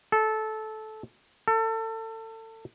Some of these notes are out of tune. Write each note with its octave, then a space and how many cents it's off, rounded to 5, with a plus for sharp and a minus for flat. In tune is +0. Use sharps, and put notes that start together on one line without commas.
A4 -15
A4 +30